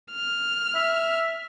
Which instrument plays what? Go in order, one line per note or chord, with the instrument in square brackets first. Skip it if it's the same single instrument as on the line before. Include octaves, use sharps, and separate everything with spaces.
[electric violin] F6
[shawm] E5